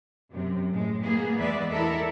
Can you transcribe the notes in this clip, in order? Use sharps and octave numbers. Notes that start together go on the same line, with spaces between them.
F#2 C3
A2 G#3
A#3 B3 G#4
E2 G#3 B3 B4 D5 E5
E4 A4 A#4 E5